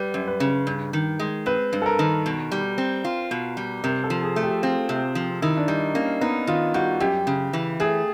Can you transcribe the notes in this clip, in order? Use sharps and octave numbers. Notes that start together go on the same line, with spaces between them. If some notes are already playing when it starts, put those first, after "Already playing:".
Already playing: G3 B4
F#2
B4
C#3
G2
D#3
G#3
C4 B4
G2
A4
A#4
D#3
B2
G3
C4
F4
B2
G3
C3 A#4
A4
F3
G#4
A3
G4
C4 F4
C3
F3
D#3 E4
D4
G3 D#4
A#3 C#4
B3 D#4
D#3 F4
G3 F#4
F#2 G4
C#3
E3
A3 G#4